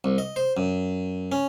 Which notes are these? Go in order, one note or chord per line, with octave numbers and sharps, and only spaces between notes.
C2
D#5
C5
F#2
C#4